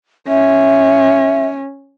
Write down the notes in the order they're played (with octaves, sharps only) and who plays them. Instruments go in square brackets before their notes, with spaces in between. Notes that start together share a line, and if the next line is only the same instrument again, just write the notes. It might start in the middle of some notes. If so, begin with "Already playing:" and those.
[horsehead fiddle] C#4 [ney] E5